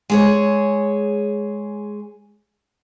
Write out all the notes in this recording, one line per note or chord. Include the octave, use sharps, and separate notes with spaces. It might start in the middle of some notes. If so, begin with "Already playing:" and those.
G#3 G#4 C#5